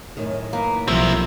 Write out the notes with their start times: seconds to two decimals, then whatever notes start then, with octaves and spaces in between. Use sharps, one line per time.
0.17 F#2 A2 D#3
0.53 A#3 B4
0.88 B1 F3 G3 A#3 C4 E4 F#5